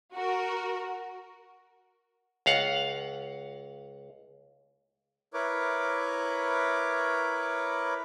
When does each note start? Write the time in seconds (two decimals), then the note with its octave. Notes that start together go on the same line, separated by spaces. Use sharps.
0.14 F#4 A#4
2.46 C#2 F5 F#5
5.34 E4 A#4 B4 C#5 D6